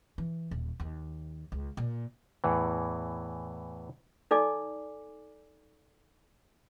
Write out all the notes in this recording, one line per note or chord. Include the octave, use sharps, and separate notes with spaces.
E3
D#1
D#2
C#2
A#2
E2 A2 E3
D#4 A4 D5 G#5 D6